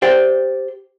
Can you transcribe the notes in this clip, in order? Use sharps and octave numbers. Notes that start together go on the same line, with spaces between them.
G4 C5 D5 G5